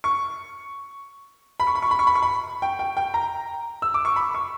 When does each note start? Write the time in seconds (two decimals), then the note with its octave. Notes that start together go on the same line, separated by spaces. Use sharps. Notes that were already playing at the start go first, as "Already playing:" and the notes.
0.04 C#6
1.60 B5
1.67 C#6
1.75 B5
1.82 C#6
1.91 B5
1.99 C#6
2.07 B5
2.15 C#6
2.22 B5
2.62 G5
2.79 G5
2.97 G5
3.14 A#5
3.82 E6
3.94 D6
4.05 C#6
4.16 B5
4.35 C#6